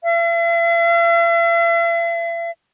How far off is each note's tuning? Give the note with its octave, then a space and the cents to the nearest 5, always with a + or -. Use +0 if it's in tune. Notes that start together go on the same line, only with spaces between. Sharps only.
E5 +45